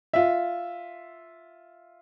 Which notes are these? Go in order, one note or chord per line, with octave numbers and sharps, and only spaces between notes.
F4 E5